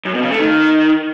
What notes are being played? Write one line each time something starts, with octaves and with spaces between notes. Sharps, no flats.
F#2
B2
C#3
A3
D#3